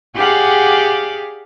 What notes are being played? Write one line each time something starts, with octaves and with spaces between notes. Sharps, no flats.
G4 G#4 D5 F5 F#5